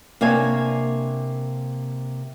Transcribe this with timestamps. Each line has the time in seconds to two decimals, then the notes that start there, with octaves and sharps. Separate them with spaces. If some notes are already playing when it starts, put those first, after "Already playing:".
0.21 C3 A#3 D4 C#5 G#5